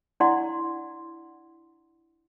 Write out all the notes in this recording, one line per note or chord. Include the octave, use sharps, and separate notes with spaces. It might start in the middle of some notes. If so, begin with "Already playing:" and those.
D4 E4 D5 F#5 C6